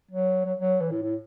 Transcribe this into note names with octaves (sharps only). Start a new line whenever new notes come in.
F#3
F#3
F#3
E3
A2
A2